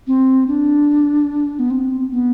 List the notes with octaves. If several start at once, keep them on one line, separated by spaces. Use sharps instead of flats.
C4
D4
B3
C4
B3